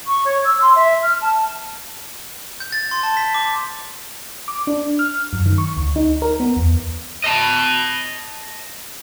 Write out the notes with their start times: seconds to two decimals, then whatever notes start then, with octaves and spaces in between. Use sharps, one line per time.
0.07 C#6
0.25 C#5
0.45 E6
0.61 C6
0.75 E5
1.02 F6
1.21 A5
2.60 G6
2.72 A6
2.91 C6
3.03 A5
3.17 B6
3.34 D6
4.48 D6
4.67 D4
4.99 F6
5.33 F#2
5.46 D#3
5.58 C#6
5.77 D2
5.96 D#4
6.22 A#4
6.40 B3
6.57 E2
7.24 D#5 A5